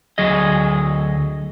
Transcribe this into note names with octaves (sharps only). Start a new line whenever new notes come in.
D2 F#3 G#4 D#5